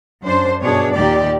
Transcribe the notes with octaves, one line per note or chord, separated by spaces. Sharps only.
F#2 D4 C5
G2 B2 D4 G#4 C#5
D#2 A#2 D#3 G4 D5